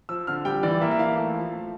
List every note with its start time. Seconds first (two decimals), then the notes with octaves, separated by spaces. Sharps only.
0.09 F3 E6
0.27 D3 F6
0.45 G3 G5
0.63 E3 D5
0.81 A#3 E5
0.92 E5
0.99 E3 F5
1.16 A3 F5
1.36 F3
1.53 A3